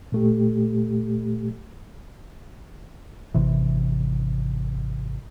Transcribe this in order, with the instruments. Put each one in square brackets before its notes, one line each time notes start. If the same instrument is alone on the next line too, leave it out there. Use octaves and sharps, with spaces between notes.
[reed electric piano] A#2 A3 G4
[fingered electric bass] G#1 C3 E3